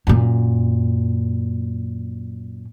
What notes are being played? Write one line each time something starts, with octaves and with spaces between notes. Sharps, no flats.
F#2 A#2